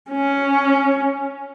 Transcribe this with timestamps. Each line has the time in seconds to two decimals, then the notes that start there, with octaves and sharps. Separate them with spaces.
0.11 C#4